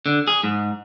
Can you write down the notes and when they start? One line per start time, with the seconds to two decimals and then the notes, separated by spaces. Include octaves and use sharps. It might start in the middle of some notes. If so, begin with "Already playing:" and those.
0.06 D3
0.27 G#4
0.44 G#2